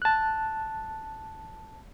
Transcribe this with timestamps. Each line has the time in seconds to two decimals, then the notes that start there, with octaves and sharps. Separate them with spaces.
0.02 A5 F#6